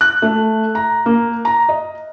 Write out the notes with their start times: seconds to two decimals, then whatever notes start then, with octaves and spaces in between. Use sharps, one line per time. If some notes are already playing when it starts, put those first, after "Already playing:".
0.01 F#6
0.22 A3
0.75 A#5
1.06 A#3
1.45 A#5
1.69 D#5